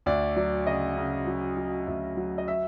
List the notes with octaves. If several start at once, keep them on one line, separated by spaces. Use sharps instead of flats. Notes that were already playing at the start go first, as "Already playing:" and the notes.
D2 D5
F#3 D5
C#3 D#5
C#3
F#3
F#3
D2 E5
F#3
D#5
E5